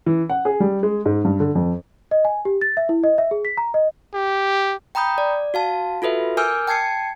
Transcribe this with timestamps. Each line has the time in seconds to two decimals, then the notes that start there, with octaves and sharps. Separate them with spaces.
0.06 E3
0.30 F#5
0.45 G#4
0.60 G3
0.83 G#3
1.06 G#2
1.25 G2
1.40 D3
1.55 F2
2.11 D#5
2.25 G#5
2.45 G4
2.61 A6
2.77 E5
2.89 E4
3.04 D#5
3.18 E5
3.31 G#4
3.45 B6
3.57 A#5
3.74 D#5
4.14 G4
4.95 G5 A#5 B5 D#6 G6
5.18 D5
5.54 F#4 F5 A5
6.02 F4 F#4 A4 B4 E5
6.37 A#4 G#5 D6 E6 F6 G6
6.67 G5 A5 G#6 C7 C#7